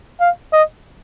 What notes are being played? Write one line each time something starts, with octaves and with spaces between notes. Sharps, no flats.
F5
D#5